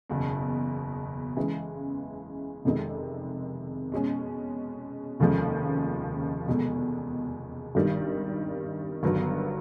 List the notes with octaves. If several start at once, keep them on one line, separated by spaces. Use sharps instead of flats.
F#1 E2 B2
C#3 E3 G#3
F1 F2 C3 D#3 G#3
B2 G#3 C#4
F1 D#2 C#3 F3 G#3
F1 E2 B2 G#3
G#1 G2 D#3 G3
G1 G2 D#3 F#3 B3